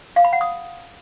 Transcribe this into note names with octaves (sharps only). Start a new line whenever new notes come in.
F5
B5
F#5
D#6